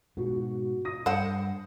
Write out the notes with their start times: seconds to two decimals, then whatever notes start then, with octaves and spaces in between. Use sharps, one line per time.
0.17 G#2 B2 F#4
0.85 D#6 A#6 D#7
1.06 G2 C5 F#5 G5